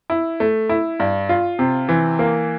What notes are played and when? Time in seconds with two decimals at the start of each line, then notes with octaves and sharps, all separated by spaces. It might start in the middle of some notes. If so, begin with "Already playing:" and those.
0.10 E4
0.40 A3
0.69 E4
1.00 G2
1.29 F4
1.59 C3
1.89 E3
2.19 A#3